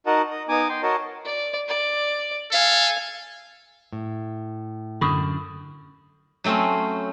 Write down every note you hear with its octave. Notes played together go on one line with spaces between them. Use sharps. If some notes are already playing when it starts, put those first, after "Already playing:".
D#4 F#4 A#4 D#5 F#5 A5
D#5
B3 D#4 G#5 D6 D#6
G5 C6
F#4 A#4 C#5 D#5 A5
D5
D5
A4 F5 G#5
A2
F#2 D3 B5 C#6 D#6
F#3 A3 C4 C#4 C5